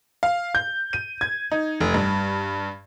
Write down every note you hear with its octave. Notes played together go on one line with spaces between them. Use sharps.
F5
G6
D#7
G#6
D#4
F1
G2